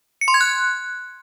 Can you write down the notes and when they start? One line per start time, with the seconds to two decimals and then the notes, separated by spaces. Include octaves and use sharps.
0.21 C#7
0.28 C6
0.34 G#6
0.41 F#6